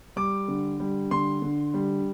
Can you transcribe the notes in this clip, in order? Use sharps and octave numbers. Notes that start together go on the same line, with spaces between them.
G3 D6
D3
G3
D3 C6
D3
G3